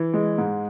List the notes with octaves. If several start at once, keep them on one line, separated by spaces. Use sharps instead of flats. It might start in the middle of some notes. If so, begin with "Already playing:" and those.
Already playing: E3
G#3
G#2